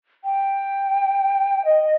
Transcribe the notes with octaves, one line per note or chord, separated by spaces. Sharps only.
G5
D#5